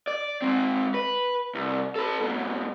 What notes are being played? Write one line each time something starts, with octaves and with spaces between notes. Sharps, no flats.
D5
G#3 C4
B4
C2
A4 B4
G#2 B2